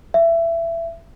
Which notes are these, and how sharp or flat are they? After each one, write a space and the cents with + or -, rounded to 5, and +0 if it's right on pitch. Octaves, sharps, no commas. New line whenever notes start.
E5 +20